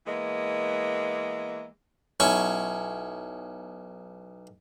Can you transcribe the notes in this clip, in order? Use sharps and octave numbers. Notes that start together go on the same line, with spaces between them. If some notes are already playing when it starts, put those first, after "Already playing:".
E3 G#3 A#3 B3
B1 C#4 E4 C#6